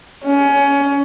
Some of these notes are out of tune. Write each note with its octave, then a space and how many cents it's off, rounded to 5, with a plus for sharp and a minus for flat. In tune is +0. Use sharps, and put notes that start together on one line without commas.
C#4 +20